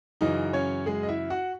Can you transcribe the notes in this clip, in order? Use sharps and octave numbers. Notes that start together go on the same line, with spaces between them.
F#2 C#3 E3 D#4 D#5
C#4 C#5
G#3 G#4
D#5
E4 E5
F#4 F#5